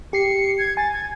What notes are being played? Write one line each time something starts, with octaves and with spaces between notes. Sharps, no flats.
G4 C7 C#7
G#6
G#5 A6
G#6